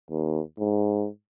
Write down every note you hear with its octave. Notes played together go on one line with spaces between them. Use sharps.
D#2
G#2